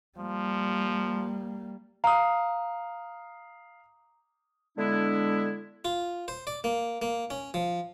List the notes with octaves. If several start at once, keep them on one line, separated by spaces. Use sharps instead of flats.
F3 G3 A#3
F5 A#5 D#6
D3 G#3 B3 D4 E4
F4
C5
D5
A#3
A#3
C#4
F3